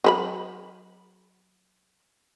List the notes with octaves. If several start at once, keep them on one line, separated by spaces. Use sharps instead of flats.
F#3 B4 B5